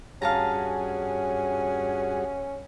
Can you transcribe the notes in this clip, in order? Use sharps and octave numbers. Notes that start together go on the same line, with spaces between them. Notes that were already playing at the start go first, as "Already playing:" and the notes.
G2 C#4 F#4 G#4 F5 A5 A#5